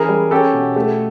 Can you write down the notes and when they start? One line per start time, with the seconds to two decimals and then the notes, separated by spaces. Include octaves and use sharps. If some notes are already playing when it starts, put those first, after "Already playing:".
Already playing: E3 C#4 G#4 A#4
0.09 G3
0.31 C#4 G4 A4
0.53 B2
0.76 A3